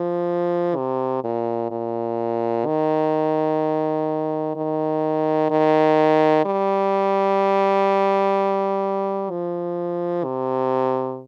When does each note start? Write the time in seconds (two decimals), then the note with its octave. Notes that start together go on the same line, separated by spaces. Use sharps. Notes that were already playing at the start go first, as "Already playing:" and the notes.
Already playing: F3
0.76 C3
1.24 A#2
1.71 A#2
2.66 D#3
4.55 D#3
5.50 D#3
6.45 G3
9.30 F3
10.24 C3